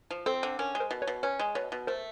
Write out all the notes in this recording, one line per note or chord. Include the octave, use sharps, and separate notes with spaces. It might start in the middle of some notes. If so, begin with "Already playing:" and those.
F3
C4 A4
D3
C#4 A#4
G#3
A#4 C5
B2
B4 C#5
B2
C#4 B4 C#5
G#3
B2 B4 C#5
B2
A3 A#4 C5